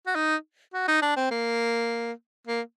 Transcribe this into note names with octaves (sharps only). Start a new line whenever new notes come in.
F#4
D#4
F#4
D#4
D4
C4
A#3
A#3